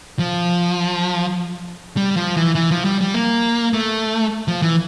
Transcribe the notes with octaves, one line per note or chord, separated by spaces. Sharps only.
F3
G3
F3
E3
E3
F3
G3
G3
A#3
A3
F3
E3